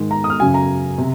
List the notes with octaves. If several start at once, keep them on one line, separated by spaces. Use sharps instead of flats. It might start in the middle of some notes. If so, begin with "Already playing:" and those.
Already playing: G#2 D#3 G#3
A#5
D#6
F6
F#2 C#3 F#3 G#5
A#5
C3